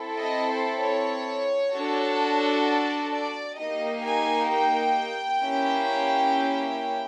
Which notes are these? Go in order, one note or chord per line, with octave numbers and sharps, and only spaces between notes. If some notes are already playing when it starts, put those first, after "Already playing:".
Already playing: C4 E4 A4
D#5
C5
C#5
D4 F#4 A4
D5
D5
A#3 D#4 G4 D#5
G#5
G5
A#3 C#4 E4 G4